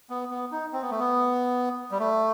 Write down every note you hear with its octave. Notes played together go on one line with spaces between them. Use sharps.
B3
B3
D#4
C4
B3
A3
B3
G3
A3